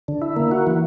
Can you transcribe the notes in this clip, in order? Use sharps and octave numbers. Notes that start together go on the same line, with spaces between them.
D3
E4
A#3
F#4
E3